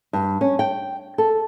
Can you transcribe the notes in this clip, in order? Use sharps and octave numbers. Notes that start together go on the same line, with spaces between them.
G2
C#4
G5
A4